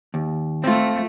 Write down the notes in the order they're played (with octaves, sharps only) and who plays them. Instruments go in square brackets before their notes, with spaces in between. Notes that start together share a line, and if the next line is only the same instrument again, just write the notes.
[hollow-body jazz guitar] D#2
[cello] A3 [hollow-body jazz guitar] C4 F4